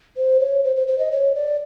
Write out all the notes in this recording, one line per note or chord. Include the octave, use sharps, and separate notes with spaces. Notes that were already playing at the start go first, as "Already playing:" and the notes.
C5
C#5
C5
C5
C5
D#5
C#5
D5